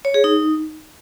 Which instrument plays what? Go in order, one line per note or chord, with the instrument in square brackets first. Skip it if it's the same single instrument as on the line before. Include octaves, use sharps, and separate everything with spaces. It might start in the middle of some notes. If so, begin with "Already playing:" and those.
[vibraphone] C#5
G#4
D#4